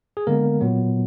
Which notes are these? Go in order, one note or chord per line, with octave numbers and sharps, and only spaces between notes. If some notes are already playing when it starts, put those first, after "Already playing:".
G#4
D3 G#3 A#3 B3 A#4
A#2 F#3 B3